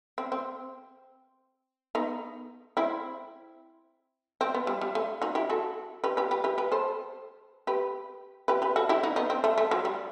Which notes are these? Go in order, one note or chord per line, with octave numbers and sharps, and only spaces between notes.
C4
C4
B3 D#4
C4 E4
C4
B3
G3
G3
A3
D#4 F#4
E4 G4
F#4 A4
G4 B4
G4 B4
G4 B4
G4 B4
G4 B4
A4 C5
G4 B4
G4 B4
G4 B4
F#4 A4
E4 G4
D#4 F#4
B3 D#4
C4
A3
A3
F#3
G3